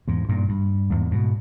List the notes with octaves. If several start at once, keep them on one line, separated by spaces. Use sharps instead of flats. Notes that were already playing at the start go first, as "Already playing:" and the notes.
E2 G#2
G2 A#2
G2
E2 G#2
G#2 B2